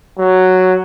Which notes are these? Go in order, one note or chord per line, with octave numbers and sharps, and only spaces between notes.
F#3